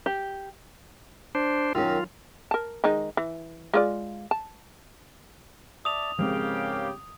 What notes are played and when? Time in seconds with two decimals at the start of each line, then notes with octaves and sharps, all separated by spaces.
0.06 G4
1.35 D4 C5
1.75 F#2 D#3 F4
2.51 A#4 A5
2.84 D#3 G#3 D#4
3.17 E3
3.74 G#3 F4 D5
4.31 A5
5.85 D5 E5 A5 D#6 F7
6.19 G#2 C#3 F3 G#3 C4 G4 A#4 F5